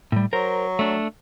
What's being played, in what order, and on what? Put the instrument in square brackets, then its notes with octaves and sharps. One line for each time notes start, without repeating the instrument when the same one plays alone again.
[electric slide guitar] A2 G3
[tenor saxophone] F#3 [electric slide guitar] A#4 C5
[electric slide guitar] A3 D4